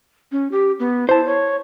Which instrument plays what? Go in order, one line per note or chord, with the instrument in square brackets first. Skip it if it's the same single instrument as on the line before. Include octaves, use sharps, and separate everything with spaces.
[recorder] C#4
G4
B3
[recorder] E4 [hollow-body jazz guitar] C5 A5
[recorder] C#5